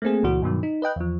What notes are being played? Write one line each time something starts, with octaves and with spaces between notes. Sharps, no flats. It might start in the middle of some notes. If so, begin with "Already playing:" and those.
A3 A#3 C4 G#4
C#2 A#2 E3 F#4
G2 B2 D#3 F#3
D#4
B4 D#5 G5 F#6
E2 F3